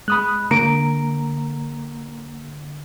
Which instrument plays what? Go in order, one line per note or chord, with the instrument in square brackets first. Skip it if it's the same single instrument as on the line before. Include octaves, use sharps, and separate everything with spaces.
[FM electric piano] G#3 [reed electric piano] B5 D#6 F#6
[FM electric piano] D3 [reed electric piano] A#3 A#5 [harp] D7